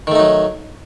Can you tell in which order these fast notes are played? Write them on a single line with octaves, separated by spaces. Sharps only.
D#3 A3 D#4 F#3